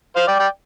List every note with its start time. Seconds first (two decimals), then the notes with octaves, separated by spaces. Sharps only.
0.16 C5 F5
0.28 D5 G5
0.40 D5 G5